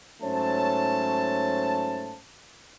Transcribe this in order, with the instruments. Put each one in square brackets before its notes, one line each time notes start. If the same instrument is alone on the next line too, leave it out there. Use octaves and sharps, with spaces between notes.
[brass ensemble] G#2 F#3 A3 C#4 C5 A5